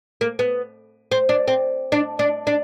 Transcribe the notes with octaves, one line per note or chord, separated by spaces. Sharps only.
A#3
B3
C4
D4
C4
D4
D4
D4